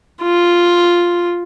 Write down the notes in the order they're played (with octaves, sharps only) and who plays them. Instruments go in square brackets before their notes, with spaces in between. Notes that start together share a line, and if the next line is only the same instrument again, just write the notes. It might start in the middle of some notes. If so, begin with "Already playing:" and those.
[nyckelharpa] F4